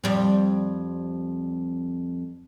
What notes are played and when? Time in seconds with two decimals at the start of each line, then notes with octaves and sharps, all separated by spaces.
0.04 F2 G3 C4